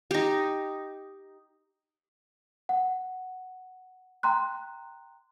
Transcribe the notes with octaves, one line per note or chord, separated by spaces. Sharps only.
D#4 G4
F#5
G5 A#5 C6 F#6